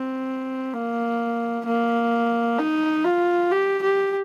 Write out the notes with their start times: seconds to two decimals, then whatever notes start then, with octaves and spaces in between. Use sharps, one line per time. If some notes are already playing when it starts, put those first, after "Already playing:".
Already playing: C4
0.74 A#3
1.66 A#3
2.59 D#4
3.05 F4
3.52 G4
3.83 G4